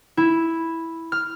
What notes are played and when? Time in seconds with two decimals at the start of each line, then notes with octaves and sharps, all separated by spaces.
0.17 E4
1.12 F6